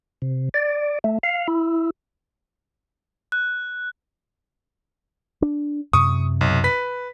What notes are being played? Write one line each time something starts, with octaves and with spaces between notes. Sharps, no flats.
C3
D5
A3
F5
E4
F#6
D4
F#2 C3 C#6 D#6
B1
B4 B6